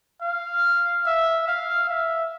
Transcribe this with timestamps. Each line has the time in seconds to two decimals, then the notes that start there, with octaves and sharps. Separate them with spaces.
0.21 F5
1.05 E5
1.47 F5
1.89 E5